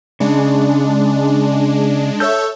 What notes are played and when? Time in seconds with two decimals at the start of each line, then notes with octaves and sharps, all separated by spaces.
0.20 C#3 G#3 D4
2.20 A4 C#5 E5 E6 G6